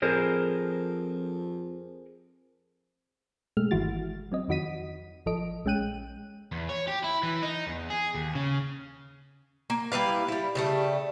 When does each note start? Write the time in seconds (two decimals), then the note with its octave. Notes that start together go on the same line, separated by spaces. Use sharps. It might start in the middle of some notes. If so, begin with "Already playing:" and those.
0.02 F2 G#4 A#4 C5
3.57 B2 G#3 A3 F6
3.71 G1 D#3 E3 E4 F#4 A6
4.32 F#3 C4 D#5
4.48 F2 D#3 F#4 D#5 B6 D#7
5.26 G#1 F3 A4 D#5 D7
5.65 A#1 G#3 C#4 G5 F#6 D#7
6.52 E2
6.69 C#5
6.88 G4
7.04 E4
7.23 E3
7.42 D#4
7.67 E2
7.90 G#4
8.15 D#2
8.35 C#3
9.70 A#3
9.92 G3 E4 B4 F5
10.28 G3 E4
10.55 C#3 G3 A3